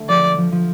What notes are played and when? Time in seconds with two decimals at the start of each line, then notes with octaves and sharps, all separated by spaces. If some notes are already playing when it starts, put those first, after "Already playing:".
Already playing: D3 A3
0.09 F3 D5
0.38 F3
0.52 F3